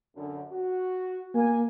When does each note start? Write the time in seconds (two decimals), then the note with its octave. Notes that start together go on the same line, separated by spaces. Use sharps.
0.15 F#2 D3
0.52 F#4
1.35 A#3 G#5